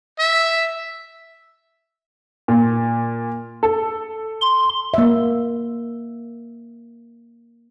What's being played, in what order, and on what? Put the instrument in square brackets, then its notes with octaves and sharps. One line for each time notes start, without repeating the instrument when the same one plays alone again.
[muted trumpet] E5
[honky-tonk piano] A#2
A4
[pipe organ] C6
[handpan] A#3 E5